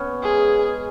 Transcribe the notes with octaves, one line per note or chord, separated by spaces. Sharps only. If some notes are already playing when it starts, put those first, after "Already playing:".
Already playing: B3 C#4
G#3 G#4